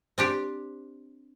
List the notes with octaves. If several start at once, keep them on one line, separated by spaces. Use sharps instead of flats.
C4 D4 G4